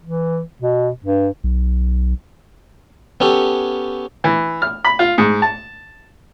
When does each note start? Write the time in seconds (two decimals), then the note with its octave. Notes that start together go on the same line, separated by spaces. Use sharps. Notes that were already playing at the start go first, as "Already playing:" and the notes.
0.03 E3
0.62 B2
1.05 G2
1.44 B1
3.20 B3 C#4 G4 A4
4.24 E3
4.62 F6
4.84 B5
4.99 F4
5.18 G#2
5.42 A5